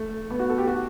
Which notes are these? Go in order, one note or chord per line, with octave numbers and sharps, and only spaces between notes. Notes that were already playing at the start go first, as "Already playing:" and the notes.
Already playing: A3
B3
F#4
A4
G4
F#4